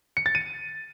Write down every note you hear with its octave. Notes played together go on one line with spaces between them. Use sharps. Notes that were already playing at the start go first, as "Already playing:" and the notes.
C#7
A6
D#7